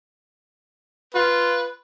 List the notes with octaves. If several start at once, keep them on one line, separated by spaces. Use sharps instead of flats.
F4 B4